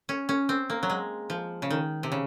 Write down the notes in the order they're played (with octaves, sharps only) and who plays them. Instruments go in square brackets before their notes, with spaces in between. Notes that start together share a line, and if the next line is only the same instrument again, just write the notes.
[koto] C#4
C#4
C4
A#3
F#3
G#3
F3
C#3
D#3
C3
C#3